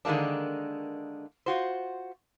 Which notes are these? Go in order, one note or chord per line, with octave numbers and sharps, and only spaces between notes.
D3 D#3 G#3 A#3 D4
F4 F#4 C5